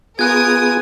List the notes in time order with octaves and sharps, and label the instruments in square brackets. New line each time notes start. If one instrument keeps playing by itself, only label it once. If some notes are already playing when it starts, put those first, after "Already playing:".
[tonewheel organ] B3 F4 G#4 [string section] A#4 G#5 D#6 [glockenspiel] F#6 G#6